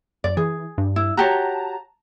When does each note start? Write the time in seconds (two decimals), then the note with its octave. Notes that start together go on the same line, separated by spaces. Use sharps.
0.24 F#2 D5
0.37 E3 G#4
0.78 G2
0.96 E4
1.17 F#4 G4 C#5 A5 A#5